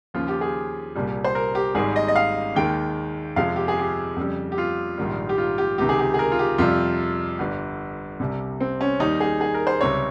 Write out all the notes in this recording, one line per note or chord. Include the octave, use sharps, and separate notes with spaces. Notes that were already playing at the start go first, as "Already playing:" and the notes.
D#2 C#3 F3 F4
G4
G#4
C2 A#2 G3
C5
A#4
G4
G#1 G#2 G3 G#4
D#5
D#5
F5
D#2 D#3 G#3 G5
F2 C3 F3 G#3 F5
G4
G#4
G4
F2 C#3 G3
G4
F4
A#1 G#2 D#3 G3
G4
F4
G4
C#2 C3 D#3 G4
G#4
G4
G#4
A#4
F4
G4
F2 C3 G3 F4
G1 G2 G3
C2 C3 G3
C4
C#4
D#2 D#3 G3 D#4
G#4
G#4
A#4
C5
C#2 C3 G3 C#5